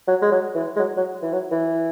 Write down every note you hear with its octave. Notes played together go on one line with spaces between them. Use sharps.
F#3
G#3
F#3
E3
G#3
F#3
F#3
E3
F#3
E3